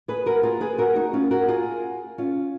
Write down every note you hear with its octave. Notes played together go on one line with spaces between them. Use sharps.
G#4 B4
F#4 A#4
F4 G#4
G#4 B4
F#4 A#4
D#4 F#4
C#4 F4
F#4 A#4
F4 G#4
C#4 F4